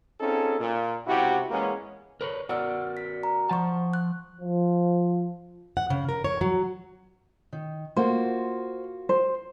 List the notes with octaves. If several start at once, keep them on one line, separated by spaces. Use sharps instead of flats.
C4 C#4 D#4 F4 G#4 A4
A#2
C#2 C3 E4 F#4 G4
E2 G#3 A#3 B3 C#4
A#4 B4 C#5
F#4 A#4 D5 F#5 E6 F6
B6
A#5
F3 F#5 A5 C#6
F#6
F3
F#5
C#3
A#4
C#5
F#3
D#3
A#3 F4 F#4 C5
C5